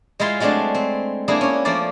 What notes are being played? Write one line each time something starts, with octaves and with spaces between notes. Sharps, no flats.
G#3 E4 F4 C6
F#3 G#3 A3 C4 D4
C4
A#3 D4 E4 G#4
C#4 C#5
F3 A3 A#3 D5